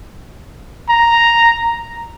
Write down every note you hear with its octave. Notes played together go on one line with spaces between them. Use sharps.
A#5